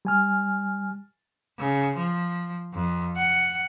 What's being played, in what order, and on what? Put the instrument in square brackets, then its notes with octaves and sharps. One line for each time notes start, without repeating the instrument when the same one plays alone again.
[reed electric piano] G3 G#5 F6
[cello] C#3
F3
F2
F#5